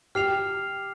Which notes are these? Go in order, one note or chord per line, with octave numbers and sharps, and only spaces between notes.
G4 F6 C7 F7